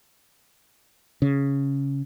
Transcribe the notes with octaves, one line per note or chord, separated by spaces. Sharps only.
C#3